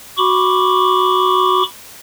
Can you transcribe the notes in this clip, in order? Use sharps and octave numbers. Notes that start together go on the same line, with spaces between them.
F#4 B5 C#6 D6